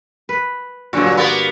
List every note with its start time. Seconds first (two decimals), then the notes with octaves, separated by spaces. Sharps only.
0.29 B4
0.93 G2 A#2 D3 F#3 F#4
1.17 A#3 B3